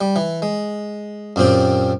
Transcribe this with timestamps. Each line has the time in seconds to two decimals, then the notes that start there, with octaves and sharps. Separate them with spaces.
0.01 G3
0.16 E3
0.42 G#3
1.36 F#2 A#2 C4 G4